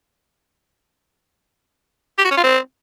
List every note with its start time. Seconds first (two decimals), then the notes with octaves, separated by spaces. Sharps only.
2.18 G4
2.24 F#4
2.31 C#4
2.37 F4
2.44 C4